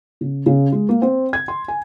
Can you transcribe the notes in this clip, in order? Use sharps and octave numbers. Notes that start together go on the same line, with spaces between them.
C#3
C#3
G#3
A#3
C4
G#6
C6
G#5